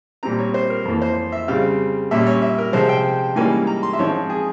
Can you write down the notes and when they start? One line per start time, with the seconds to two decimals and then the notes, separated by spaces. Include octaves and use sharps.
0.23 A#2 G3 C4 A#5
0.39 C#5
0.54 C5
0.70 A#4
0.85 F2 E3 A#3
1.02 C5
1.32 E5
1.48 C#3 G3 C4 F5
2.11 A#2 G3 C#4 E5
2.26 C#5
2.42 E5
2.58 A#4
2.73 C3 F3 G#3 C5
2.89 G5
3.35 G#2 E3 G3 A#3 C#4 G#5
3.67 A#5
3.83 C6
3.93 E5
3.99 G#2 F3 C4 C#5
4.30 G#4